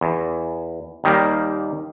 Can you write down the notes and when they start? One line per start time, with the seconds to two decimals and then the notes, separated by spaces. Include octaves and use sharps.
0.01 E2
1.04 D#2 D#3 G3 A#3